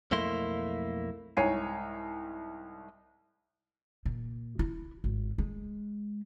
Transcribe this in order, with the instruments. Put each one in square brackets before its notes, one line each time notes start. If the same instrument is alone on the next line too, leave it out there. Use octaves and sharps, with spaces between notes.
[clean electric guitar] B1 F2 A3 A#3 E4 C6
[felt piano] C2 G#2 C#5 G#5 C7 D#7
[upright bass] A#2
E4
G#1
G#3